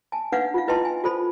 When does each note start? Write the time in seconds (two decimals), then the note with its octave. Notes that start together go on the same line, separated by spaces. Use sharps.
0.12 G#5 A5
0.32 D4 D#4 B4 C#5 F5 F#5
0.54 F4 F5
0.68 E4 B4 D#5 G5 A5 C6
0.85 G#5
1.04 F4 A4 C5 B5